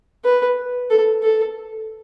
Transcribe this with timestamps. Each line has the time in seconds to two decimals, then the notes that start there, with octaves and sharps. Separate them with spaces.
0.24 B4
0.90 A4
1.23 A4